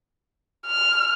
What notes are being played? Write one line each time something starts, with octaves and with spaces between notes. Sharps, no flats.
F6